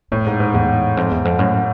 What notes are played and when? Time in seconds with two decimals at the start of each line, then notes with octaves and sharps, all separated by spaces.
0.12 F2 A2
0.26 G#2
0.40 G#2
0.54 E2 G#2
0.97 F2
1.11 E2
1.25 F2
1.39 F#2 A2